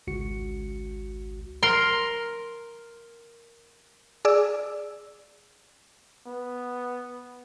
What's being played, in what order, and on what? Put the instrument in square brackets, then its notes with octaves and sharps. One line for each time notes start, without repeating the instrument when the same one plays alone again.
[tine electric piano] G#1 C#2 F#4 C#7
[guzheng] A#4 C6
[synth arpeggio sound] G#4 D5 E6
[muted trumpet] B3